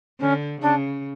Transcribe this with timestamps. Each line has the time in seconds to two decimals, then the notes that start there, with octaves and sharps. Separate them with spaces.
0.20 D3 C#4
0.61 C#3 D4